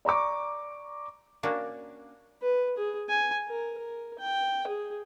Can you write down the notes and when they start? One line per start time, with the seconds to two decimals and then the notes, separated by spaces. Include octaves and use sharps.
0.05 D5 A#5 C#6 D6
1.43 A#3 C#4 D4 F#4
2.41 B4
2.77 G#4
3.09 G#5
3.48 A#4
3.77 A#4
4.18 G5
4.67 G#4